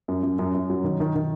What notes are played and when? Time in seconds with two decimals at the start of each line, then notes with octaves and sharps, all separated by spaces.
0.08 F#2
0.23 F#2
0.39 F#2
0.54 F#2
0.70 F#3
0.84 D#3
1.00 D#3
1.15 D#3